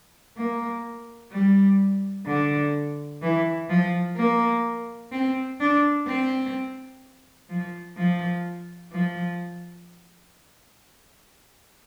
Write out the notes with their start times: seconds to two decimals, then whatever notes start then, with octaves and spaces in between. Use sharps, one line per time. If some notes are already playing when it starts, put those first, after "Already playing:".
0.37 A#3
1.31 G3
2.27 D3
3.22 E3
3.69 F3
4.16 A#3
5.12 C4
5.60 D4
6.07 C4
7.50 F3
7.97 F3
8.93 F3